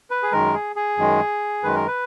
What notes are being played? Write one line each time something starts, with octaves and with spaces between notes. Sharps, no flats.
B4
G#4
F#2 D#3 G#3 A#4
G#4
G#4
F#2 D#3 G#3
F#2 D#3 G#3 B4
A#4
B4